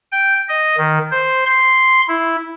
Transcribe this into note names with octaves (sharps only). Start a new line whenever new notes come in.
G5
D#5
D#3
C5
C6
E4